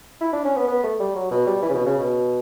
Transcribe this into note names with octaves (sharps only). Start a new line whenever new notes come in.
E4
D4
C#4
B3
B3
A3
G3
F#3
B2
G3
E3
C#3
B2
C#3
B2